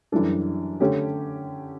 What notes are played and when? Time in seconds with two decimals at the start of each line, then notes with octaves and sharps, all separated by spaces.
0.12 F#2 E3 G3 D4 A4
0.80 D3 A3 C#4 G4